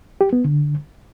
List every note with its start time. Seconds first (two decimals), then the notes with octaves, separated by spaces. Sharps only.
0.21 G4
0.33 B3
0.45 D3